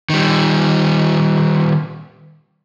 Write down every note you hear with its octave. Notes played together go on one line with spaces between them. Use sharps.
D#3 G3